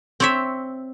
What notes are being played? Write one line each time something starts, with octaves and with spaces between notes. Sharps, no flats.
C4 C#5 E5